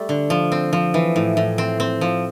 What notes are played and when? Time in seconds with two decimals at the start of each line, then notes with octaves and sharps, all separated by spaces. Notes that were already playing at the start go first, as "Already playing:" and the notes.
Already playing: G3 A3
0.09 D3
0.30 F3
0.52 C4
0.73 F3
0.94 E3
1.16 A2
1.37 A2
1.58 C4
1.80 C4
2.01 F3